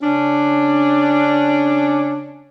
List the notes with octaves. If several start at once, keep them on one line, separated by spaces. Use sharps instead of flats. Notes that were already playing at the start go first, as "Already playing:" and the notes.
C#3 C#4 D4